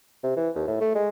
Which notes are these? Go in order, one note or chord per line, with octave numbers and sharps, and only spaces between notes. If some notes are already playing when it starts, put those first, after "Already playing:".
C3
E3
D#2
A2
A3
G#3